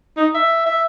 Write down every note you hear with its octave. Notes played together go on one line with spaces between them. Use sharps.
D#4
E5
E5